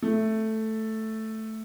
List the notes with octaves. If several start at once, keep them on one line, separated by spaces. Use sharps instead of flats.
A3